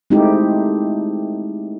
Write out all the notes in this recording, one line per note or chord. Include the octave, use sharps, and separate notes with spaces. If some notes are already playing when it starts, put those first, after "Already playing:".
G#3 A3 C4 D#4 E4 G4